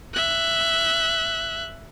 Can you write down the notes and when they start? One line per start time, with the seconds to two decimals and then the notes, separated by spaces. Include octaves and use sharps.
0.14 E5 F#6